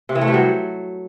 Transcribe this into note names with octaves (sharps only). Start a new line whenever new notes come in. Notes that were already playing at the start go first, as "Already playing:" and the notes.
C3
E3
A3
G3
F#3